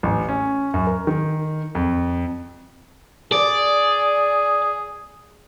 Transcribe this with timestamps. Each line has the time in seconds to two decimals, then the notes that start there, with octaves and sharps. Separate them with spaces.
0.03 A1
0.29 C#4
0.74 F#2
0.87 A#4
1.07 D#3
1.75 F2
3.32 G#4 D5